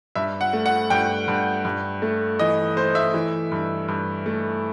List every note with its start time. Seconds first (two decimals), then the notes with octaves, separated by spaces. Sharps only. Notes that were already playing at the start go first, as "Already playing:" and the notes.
0.15 G2 E5
0.41 F#5
0.53 A3
0.66 F#5
0.90 G2 G5
1.28 G2
1.65 G2
2.02 A3
2.39 E3 D#5
2.77 A3 C5
2.95 E5
3.14 E3
3.52 G2
3.88 G2
4.26 A3